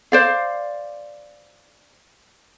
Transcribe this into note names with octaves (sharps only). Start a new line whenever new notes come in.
C5 D5 F5